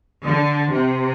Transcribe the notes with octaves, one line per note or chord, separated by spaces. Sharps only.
D3
C3